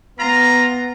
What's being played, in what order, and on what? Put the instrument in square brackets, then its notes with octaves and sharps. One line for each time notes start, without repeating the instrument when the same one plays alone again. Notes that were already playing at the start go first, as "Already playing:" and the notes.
[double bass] B3 [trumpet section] F4 A#5